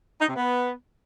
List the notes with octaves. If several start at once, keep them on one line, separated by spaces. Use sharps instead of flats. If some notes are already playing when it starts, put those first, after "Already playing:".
D#4
C3
B3